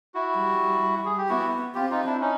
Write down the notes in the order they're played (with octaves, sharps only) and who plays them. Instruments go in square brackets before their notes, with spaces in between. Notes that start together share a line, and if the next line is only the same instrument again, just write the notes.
[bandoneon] E4 F#4
[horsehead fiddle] G3
[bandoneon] G#4
G4
[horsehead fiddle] B3 [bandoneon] E4 F#4
[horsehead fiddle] C4 [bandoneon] F4 G4
[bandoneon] D#4 F4
D4 E4
C#4 D#4